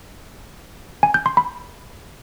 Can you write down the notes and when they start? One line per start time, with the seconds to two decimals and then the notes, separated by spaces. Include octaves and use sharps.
1.03 G#5
1.14 G6
1.26 C6
1.37 B5